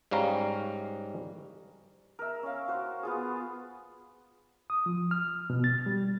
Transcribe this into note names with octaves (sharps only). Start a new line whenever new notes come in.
G#2 G3 C#4 F5 A#5
A#4 E5
C#4 F5
F#4 C5
B3 F4 G#4
D#6
F3
F6
B2
A6
G3